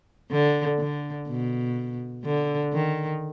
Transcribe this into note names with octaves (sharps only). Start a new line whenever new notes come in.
D3
D3
B2
D3
D#3